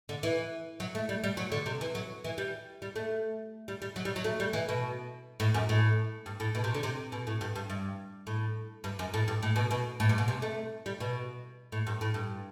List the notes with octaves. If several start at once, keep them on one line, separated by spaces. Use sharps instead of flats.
D3
E3
F#3
A3
G3
G3
F#3
D3
C3
E3
F#3
E3
G3
G3
A3
G3
G3
F#3
G3
F#3
A3
G3
E3
B2
A2
F#2
A2
G2
A2
B2
C3
D3
C3
B2
A2
G2
G2
G2
A2
G2
F#2
A2
G2
A2
B2
B2
A2
G2
B2
C3
A3
G3
B2
A2
G2
A2
G2